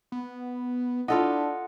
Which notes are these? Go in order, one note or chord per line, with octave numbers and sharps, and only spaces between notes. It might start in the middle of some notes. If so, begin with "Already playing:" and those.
B3
D4 E4 F4 A4 D#5 F#5